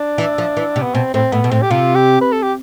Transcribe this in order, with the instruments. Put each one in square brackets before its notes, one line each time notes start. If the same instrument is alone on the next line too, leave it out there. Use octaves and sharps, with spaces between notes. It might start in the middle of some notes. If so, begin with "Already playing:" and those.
Already playing: [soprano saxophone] D4
[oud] E3
F3
E3
C3
[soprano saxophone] B3
[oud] B2 [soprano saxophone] C4
[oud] A2 [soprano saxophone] C4
[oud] A2 [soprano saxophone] B3
[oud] B2
[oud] A2 [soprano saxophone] C4
[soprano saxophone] G4
[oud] C3 [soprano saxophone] F4
[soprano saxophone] G4
B4
A4
G4